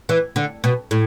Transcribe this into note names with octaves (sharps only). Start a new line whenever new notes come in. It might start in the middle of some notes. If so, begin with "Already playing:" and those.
E3
D3
B2
A2